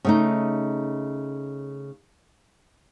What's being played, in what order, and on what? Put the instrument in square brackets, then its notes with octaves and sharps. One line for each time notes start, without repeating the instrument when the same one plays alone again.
[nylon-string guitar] C#3 A3 D#4